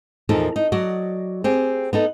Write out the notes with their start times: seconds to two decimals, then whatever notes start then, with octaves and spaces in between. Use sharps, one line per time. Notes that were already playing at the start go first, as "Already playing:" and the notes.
0.29 E2 A#2 F3 D#4 A4 A#4
0.56 D#4
0.72 F#3 F#4 D5 D#5
1.44 C4 G4 G#4
1.93 B3 D#4 A4